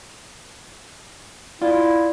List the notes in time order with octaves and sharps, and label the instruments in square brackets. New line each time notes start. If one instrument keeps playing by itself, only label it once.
[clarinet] E4 [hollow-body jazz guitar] F4 [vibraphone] D5